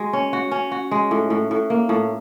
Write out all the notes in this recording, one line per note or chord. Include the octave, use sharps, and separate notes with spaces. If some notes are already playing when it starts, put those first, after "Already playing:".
Already playing: G#3 F#4
C#4
F#4
C#4
F#4
G#3
A2
A2
A2
A#3
A2